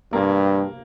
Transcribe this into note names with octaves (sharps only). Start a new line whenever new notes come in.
G2 A#3